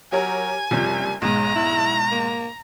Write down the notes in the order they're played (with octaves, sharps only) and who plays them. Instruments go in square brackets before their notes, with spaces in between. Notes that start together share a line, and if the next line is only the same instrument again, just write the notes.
[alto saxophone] F#3 [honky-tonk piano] G4 A#4 C#5 [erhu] G#5
[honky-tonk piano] F#1 C3 F3 [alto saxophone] G3
[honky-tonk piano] B1 G#2 [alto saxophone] G#3 [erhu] A#5
[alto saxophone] E4
A#3